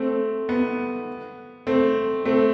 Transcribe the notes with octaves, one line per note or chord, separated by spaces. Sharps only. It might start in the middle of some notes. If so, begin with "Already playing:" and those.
Already playing: A3 C4
B3
A3 C4
A3 C4